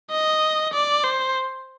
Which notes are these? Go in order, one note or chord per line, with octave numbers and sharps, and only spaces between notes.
D#5
D5
C5